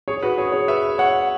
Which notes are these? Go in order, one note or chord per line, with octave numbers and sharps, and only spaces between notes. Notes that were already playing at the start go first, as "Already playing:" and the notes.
G#4 C#5
F#4 B4
G#4 C#5
G#4 C#5
B4 E5
C#5 F#5